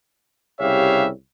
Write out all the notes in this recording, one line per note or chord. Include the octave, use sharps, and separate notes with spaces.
C2 C#3 G4 C#5 E5 F5